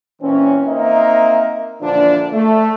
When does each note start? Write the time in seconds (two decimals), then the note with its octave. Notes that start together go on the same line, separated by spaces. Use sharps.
0.22 A#2 E3 C4 C#4
0.67 A#3 C4 D#4 D#5 E5
1.81 A#2 D3 E3 F3 D4
2.32 A3